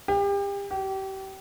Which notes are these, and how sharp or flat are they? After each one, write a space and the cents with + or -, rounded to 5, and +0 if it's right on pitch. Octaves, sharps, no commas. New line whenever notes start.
G4 +35
G4 -30